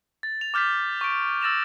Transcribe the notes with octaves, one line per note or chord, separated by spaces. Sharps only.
A6
F7
D6 F6 G6 A6 B6
C#6 D7
E6 A6 A#6 E7 F7